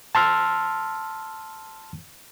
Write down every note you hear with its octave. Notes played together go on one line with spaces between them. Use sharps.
A5 C6 E6 F6